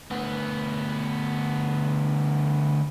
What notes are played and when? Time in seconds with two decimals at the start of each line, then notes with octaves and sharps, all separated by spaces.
0.11 D2 B3